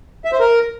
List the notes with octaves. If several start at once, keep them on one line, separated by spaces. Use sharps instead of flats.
E5
C5
A#4